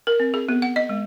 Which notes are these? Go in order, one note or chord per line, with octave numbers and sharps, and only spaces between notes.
A#4
C4
G#4
B3
F#5
D#5
G#3